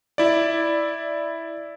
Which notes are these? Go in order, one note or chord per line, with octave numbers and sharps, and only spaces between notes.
E4 D5